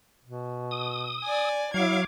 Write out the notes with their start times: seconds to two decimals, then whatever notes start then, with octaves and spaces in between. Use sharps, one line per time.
0.25 B2
0.71 D#6
1.24 D5 G#5
1.74 F#3 E4 F5 D6 G#6